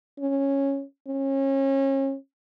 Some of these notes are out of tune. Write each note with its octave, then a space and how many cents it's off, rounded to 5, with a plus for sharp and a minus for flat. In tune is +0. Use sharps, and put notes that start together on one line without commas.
C#4 -10
C#4 -30